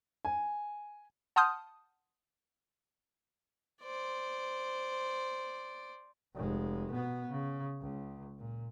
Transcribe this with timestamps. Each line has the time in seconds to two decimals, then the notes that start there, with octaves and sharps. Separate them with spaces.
0.25 G#5
1.36 F#5 A5 C6 D#6 F6 G6
3.82 C5 D5
6.35 F1 G#3
6.91 B2 B3
7.30 C#3
7.81 C#2
8.38 A#2